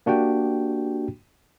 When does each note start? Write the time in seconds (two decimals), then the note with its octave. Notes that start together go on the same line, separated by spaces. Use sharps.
0.06 A#3 D4 F#4 G4 G5